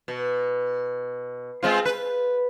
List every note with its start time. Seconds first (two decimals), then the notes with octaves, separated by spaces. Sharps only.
0.08 B2
1.63 G#3 C4 F4
1.85 B4